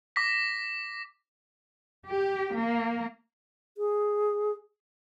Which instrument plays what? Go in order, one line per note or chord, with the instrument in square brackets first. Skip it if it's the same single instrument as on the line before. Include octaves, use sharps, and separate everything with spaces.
[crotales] D6 A#6 B6
[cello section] G4
A#3
[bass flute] G#4